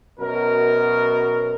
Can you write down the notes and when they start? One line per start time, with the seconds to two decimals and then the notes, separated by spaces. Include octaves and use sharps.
0.20 F#2 B2 A#4